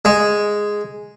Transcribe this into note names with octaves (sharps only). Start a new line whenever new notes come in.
G#3